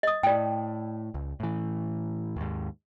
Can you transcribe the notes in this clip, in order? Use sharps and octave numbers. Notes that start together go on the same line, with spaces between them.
D#5 D#6
A2 D5 G5
C#2
A2 E3
D#2 G#2